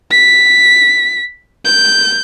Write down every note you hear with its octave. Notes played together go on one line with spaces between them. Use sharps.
B6
G6